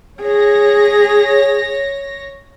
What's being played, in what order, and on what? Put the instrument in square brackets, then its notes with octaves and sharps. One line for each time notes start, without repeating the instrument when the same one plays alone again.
[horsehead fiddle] G#4 [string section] C#5 A#6